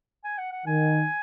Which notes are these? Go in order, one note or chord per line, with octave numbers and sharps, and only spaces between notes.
G#5
F#5
F#5
D#3 G#5